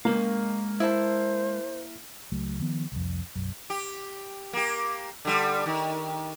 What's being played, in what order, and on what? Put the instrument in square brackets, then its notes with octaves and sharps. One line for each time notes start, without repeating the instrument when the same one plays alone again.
[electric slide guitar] G#3 F5 [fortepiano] A#3
[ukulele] E4 A5 [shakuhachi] C5
[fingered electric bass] C#2 F#3 A3
D#3 F3 B3
C2 F2
B1 F#2
[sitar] G4
A#3 G4
D3 G3
D#3